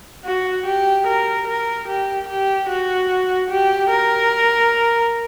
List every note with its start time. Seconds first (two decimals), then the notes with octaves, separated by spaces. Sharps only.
0.25 F#4
0.66 G4
1.07 A#4
1.47 A#4
1.88 G4
2.28 G4
2.69 F#4
3.50 G4
3.90 A#4